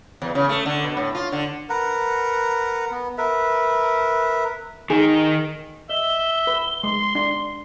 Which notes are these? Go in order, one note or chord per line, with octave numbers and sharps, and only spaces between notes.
E2
C#3
A3
D3
B2
A2
F4
D3
A#4 B4 F#5 A#5
B3
A#4 B4 E5
D#3 D#4 G#4
D#5 E5 G7
B4
G#3 C6
D4